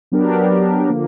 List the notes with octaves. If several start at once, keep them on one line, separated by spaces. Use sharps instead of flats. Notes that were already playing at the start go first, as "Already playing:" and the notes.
F#3 B3 D4 G4 A#4
D3 F3 A#3